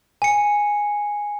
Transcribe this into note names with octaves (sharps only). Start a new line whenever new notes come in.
G#5 C#7